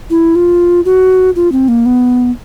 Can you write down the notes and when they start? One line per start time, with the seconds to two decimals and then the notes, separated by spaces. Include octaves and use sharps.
0.10 E4
0.35 F4
0.85 F#4
1.36 F4
1.52 C4
1.68 A#3
1.86 B3